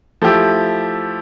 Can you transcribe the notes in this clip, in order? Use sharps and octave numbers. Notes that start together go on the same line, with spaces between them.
F3 A3 E4 G4